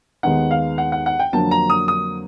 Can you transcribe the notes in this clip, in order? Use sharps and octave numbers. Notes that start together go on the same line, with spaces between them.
D#2 D#3 G#3 B3 D#4 F#5
F5
F#5
F#5
F#5
G5
F2 D3 F#3 A#3 A5
A#5
D#6
D#6